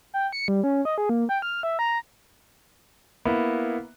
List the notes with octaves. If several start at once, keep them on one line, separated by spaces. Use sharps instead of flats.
G5
C#7
G3
C#4
D#5
G#4
A#3
G5
F6
E5
A#5
A#3 B3 E4